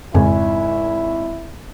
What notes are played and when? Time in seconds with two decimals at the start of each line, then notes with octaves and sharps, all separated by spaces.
0.14 G#1 F2 G#2 C#3 E4 G#5